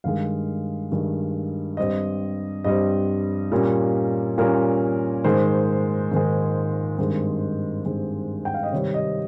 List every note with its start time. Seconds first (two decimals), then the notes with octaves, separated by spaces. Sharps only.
0.04 G2 D#3 G#3 F5
0.92 G2 D#3 G#3
1.77 G2 G3 C4 D#5
2.64 G2 G3 C4 D#5
3.52 A#2 G3 A#3 C#4
4.38 A#2 G3 A#3 C#4 A#4
5.24 G#2 D#3 G#3 C5
6.12 G#2 D#3 G#3
6.99 G2 D#3 G#3 C4
7.86 G2 D#3 G#3 C4
8.45 G5
8.54 F5
8.63 D#5
8.72 C3 D#3 G3 C4 C#5
8.94 D#5